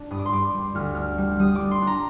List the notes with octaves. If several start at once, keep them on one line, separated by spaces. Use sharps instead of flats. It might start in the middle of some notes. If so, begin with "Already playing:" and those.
Already playing: D4
G2 D#6
D6
C6
G2 D6
G3
D2 F6
D4 F6
G3
G3 D#6
D6
D4
C6
D4
A#5